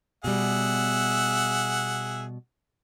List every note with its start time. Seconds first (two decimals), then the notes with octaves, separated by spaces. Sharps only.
0.24 B2 G3 G#4 E5 F#5